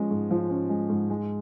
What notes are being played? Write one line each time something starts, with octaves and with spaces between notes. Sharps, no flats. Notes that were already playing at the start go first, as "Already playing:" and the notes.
Already playing: F3 G#3 C#4
G#2
F3
C#4
G#3
G#2
G#3